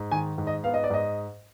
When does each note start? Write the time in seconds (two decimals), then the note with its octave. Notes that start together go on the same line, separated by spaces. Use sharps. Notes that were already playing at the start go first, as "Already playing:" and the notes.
Already playing: G#2
0.11 D#3 G#5
0.38 G#2
0.47 D#5
0.64 B3 F5
0.74 D#5
0.84 D5
0.90 G#2 D#5